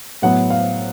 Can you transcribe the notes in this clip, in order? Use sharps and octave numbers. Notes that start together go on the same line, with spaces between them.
A2 F#3 B3 F#5
F5